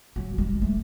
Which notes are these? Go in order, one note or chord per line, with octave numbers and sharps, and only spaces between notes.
F#3
G#3
A3